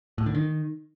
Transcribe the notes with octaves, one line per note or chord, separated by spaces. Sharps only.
A2
D3
D#3